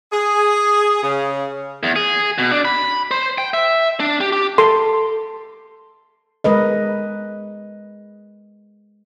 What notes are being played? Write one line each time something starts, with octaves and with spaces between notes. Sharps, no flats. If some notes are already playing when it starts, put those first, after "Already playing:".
G#4
C#3
E2
G#4
B2
D4
B5
C5
G5
E5
D4
G4
G4
A4 C6
G#3 A#4 B4 D#5